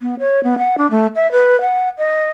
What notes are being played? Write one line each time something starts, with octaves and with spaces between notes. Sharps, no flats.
B3
C#5
B3
F#5
D4
A3
E5
B4
F#5
D#5